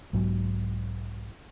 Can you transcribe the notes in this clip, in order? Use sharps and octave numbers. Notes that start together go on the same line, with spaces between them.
B1 G#2 B2 F#3